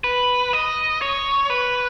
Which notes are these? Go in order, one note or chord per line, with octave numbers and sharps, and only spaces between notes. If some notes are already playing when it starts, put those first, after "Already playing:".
B4
D#5
C#5
B4